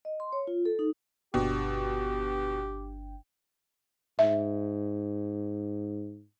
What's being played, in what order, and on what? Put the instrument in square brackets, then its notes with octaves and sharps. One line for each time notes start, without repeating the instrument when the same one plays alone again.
[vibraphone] D#5
C6
C#5
F4
A4
D#4
[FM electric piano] G1 D4 G5 [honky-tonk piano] B2 [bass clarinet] G4
[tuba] G#2 [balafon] E5